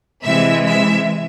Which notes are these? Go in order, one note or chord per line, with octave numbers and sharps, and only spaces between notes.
C3 E3 G#3 E5
E5